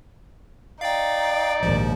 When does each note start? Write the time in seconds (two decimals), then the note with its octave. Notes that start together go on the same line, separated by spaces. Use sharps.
0.81 D#4 D5 F5 G5
1.63 A#1 D#2 G#2 F3